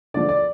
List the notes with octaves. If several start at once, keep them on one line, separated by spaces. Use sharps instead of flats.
D3 F3 A3 D5
D5